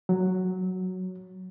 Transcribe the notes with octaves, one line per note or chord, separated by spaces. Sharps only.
F#3